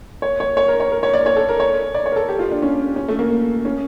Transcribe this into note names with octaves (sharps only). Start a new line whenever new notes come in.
C#5
C#5
C#5
A#4
C#5
A#4
C#5
D5
C#5
A4
A#4
C#5
D5
C#5
A#4
A4
G4
F4
D4
C#4
C#4
A3
A#3
C#4